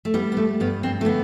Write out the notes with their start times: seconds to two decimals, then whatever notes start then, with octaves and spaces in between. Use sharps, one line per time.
0.05 A3
0.14 G3 B3
0.32 B3
0.37 A3
0.60 G2 B3
0.83 C4
1.01 A3
1.05 D3 B3